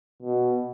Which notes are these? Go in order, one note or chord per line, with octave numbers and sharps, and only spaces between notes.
B2